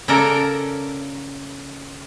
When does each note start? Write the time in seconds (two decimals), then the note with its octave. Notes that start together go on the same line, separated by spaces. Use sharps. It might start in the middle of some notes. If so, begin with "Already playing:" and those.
0.08 C#3 A4 A#4 D5 A#5